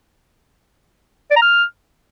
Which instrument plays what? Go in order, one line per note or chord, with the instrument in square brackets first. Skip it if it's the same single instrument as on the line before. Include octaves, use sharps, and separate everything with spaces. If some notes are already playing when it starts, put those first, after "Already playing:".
[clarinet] D5
A#5
F6